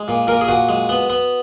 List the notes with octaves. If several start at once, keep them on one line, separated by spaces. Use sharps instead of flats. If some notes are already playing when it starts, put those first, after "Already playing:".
Already playing: G#3
A#2
A#2 A#4
G#4
A#2 F#4
G#3
B3
B3